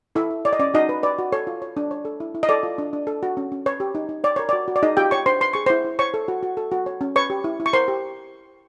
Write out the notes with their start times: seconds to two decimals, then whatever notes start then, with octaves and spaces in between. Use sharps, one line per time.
0.15 E4 A4 E5
0.31 E4
0.45 C#5 D5
0.53 D#5
0.59 C#4 D5
0.74 D#4 F#4 D#5
0.89 B4
1.03 B4 D5
1.18 F#4
1.32 A4 C#5
1.47 F4
1.62 C#5
1.77 D4
1.91 C#5
2.05 A4
2.20 E4
2.35 E4
2.43 D#5
2.49 A4 D5
2.63 F4
2.78 D4
2.93 D4
3.07 A4
3.23 F#4
3.37 C#4
3.52 C#4
3.66 B4 C#5
3.80 G4
3.95 D#4
4.09 D#4
4.24 C#5 D5
4.36 A#4 C#5
4.49 F#4 D5
4.68 F#4
4.76 D5
4.83 D#4 G#4 D#5
4.97 F4 G4 G5
5.11 C#5 C#6
5.26 D4 C5 C6
5.41 B4 C6
5.53 G#4 C#6
5.66 E4 C5 C6
5.85 E4
5.99 C5 C#5 C#6
6.14 A4
6.28 F#4
6.43 F#4
6.57 A4
6.72 F#4
6.86 C#5
7.01 C#4
7.16 B4 C#5 C#6
7.30 G4
7.44 E4
7.60 E4
7.66 C#6
7.73 A#4 C5 C6
7.88 G4